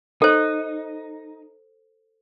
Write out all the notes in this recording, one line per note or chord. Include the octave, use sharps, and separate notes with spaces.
D#4 A4 C5